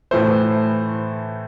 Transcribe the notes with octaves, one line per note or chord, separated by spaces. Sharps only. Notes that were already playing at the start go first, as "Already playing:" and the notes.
A2 E3 A3 C5